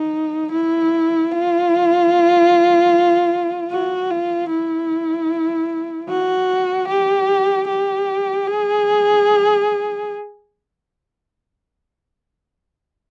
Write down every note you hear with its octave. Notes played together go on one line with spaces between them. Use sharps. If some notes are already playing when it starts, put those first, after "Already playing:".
Already playing: D#4
E4
F4
F#4
F4
E4
F#4
G4
G4
G#4